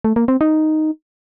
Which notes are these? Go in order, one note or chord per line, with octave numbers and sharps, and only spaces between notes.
A3
A#3
C4
D#4